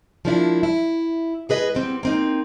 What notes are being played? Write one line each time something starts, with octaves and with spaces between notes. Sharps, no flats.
F3 G#3 A#3 D4 E4
E4
G#3 G#4 B4 D#5
G3 B3 C4
A#3 C4 D#4